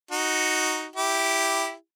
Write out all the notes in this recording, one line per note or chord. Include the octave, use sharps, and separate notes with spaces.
D#4 F#4
E4 G4